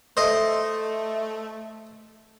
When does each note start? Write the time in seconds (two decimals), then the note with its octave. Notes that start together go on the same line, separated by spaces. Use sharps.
0.17 A3 C5 D#5